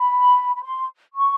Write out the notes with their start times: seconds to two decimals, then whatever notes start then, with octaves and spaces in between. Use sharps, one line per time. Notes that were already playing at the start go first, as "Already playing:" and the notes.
Already playing: B5
0.55 B5
0.62 C6
1.13 C#6